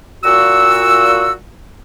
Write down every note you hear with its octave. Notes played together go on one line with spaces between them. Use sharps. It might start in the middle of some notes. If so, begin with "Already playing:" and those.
A#2 F#4 E6